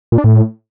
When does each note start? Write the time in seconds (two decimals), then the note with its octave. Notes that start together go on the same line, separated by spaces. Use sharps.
0.12 A#2
0.18 D4
0.24 A2